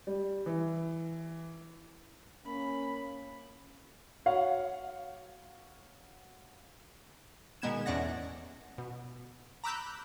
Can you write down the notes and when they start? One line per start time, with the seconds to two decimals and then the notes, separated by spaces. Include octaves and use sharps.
0.07 G3
0.46 E3
2.46 A#3 C#4 B5
4.26 F#4 C#5 F5 F#5
7.62 B2 D#3 G#3 B3 G#6 E7
7.86 E2 A2 C#4 D5 F#5 A#6
8.78 B2
9.64 A#5 B5 D6 E6 F#6 G6